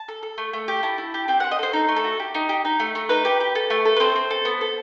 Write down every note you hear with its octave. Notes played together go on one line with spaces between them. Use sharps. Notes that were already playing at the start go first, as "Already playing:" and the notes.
Already playing: A5
A4
A4
A3
A3
G4
E4 A5
E4
G4
C4 G5
C4 F#5
D#5
A4 C5
D#4
A3
A4
F#4
G4
D#4
G4
D#4
A3
A3
D#4 B4
G4
G4
A4
A3
A4
B4
C4 C5
C4
A4
B3
A4